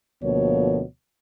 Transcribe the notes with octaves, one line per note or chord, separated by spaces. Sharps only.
D2 B2 F3 A#3 C#5